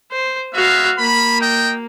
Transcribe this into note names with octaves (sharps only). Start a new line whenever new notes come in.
C5
G#3 B3 F#4 E5 F5
A#3 B5
D#5 G5